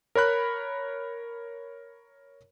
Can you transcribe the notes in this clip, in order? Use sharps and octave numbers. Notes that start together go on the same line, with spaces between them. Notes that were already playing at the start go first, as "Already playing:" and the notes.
A#4 C#5 B5 F#6